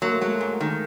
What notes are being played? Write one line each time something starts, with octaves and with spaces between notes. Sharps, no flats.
F#3 A#3
A3
F#3 G#3
A3
G#2
D#3